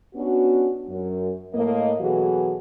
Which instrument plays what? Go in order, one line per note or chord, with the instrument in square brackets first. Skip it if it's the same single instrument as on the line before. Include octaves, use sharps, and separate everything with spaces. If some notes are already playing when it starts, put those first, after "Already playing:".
[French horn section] B3 C#4 D4 F#4
F#2
A2 A#3 D#5
B2 E3 F#3 F#4 G#4 A4